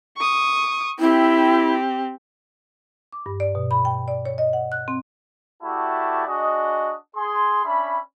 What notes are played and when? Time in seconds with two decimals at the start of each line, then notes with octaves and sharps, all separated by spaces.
0.17 C#6 D#6
0.99 C4 E4 G4
3.13 D6
3.26 G2
3.40 D5
3.55 B2
3.71 B5
3.85 G5
4.08 D5
4.25 C#5
4.38 D#5
4.53 F#5
4.72 F#6
4.88 C4
5.63 A3 E4 F#4 G4 D5 A5
6.28 D4 F#4 G#4 D#5
7.17 G#4 C6
7.66 C#4 D4 E5 B5